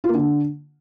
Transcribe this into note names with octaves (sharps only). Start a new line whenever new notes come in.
F4
A#3
D3